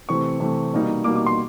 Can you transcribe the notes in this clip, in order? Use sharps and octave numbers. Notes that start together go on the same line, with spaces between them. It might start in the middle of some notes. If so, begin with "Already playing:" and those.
C3 E3 A3 C4 C#6
C3 E3 A3 C4
B2 G3 A#3 D#4
B2 G3 A#3 D#4 D6
D6
C6